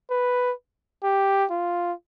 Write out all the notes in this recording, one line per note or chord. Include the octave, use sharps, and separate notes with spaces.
B4
G4
F4